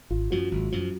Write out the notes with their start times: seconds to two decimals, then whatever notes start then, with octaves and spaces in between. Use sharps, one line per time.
0.10 G#1 F4
0.31 F#2 F3 F#3 F#4
0.52 G#1
0.72 F#2 F3